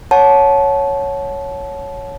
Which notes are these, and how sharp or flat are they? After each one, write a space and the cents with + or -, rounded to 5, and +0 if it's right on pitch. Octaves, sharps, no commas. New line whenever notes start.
C#5 +0 F#5 +0 A5 -20